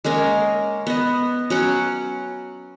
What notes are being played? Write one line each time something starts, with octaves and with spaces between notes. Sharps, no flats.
G#3 A#3 C#4 A#4
B3 D#5
F#3 C#4 F#5